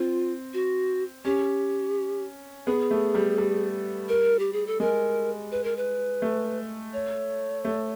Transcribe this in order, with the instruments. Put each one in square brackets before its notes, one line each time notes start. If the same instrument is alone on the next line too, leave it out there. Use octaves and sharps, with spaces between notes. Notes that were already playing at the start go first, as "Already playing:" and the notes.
Already playing: [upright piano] C4 [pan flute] F4
[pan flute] F#4
[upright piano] C#4 [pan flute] G4
[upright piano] B3 [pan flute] G#4
[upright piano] A3
G3
G3
[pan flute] A#4
G4
G#4
A4
[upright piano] G#3 [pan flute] A#4
[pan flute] B4
A#4
B4
[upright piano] A3
[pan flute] C#5
[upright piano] A3